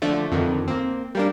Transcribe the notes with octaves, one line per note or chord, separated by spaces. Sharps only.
D3 F3 A3
F2 D3 D#3
A#3 C4
G3 A#3 D4